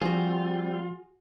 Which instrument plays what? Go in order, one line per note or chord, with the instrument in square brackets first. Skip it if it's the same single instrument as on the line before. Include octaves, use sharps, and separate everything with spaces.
[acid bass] F3 [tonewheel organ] G3 C4 [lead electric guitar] F4 [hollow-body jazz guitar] F#4 G#4